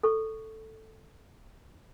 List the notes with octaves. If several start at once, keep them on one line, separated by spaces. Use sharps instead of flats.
A4 C#6